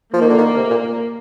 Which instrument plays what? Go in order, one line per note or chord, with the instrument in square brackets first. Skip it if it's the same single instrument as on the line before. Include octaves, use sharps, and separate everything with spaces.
[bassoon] F3 [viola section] A#3
[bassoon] D#3
D3
D#3
C3
A#2